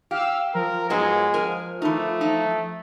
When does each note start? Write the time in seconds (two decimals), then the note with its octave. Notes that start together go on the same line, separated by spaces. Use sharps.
0.11 G4 F5 E6
0.55 F3 A#4
0.90 G#2 F#3 G#3 B3
1.34 A#4 G#5
1.82 E3 A3 D#4
2.21 D#4